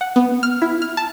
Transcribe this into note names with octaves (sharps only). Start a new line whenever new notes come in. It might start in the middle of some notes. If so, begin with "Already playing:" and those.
F#5
B3
F6
E4
F6
A5